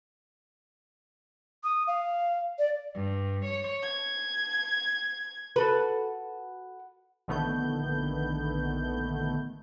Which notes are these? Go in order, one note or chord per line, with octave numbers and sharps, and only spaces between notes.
D#6
F5
D5
G2
C#5
G#6
F#4 A4 B4
A#1 D3 D#3 A3 B3 G6